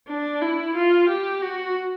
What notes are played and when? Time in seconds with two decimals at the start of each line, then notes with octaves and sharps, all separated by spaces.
0.08 D4
0.42 E4
0.75 F4
1.08 G4
1.42 F#4